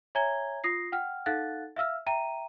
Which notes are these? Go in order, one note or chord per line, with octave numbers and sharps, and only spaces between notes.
C#5 E5 G#5 A#5 G#6 G7
F4 D#6 A#6 C7
F#5 G5 F6
D#4 A4 F5 F#5 F#6 A6
E5 F5 E6 F6
E5 G5 A#5 D#7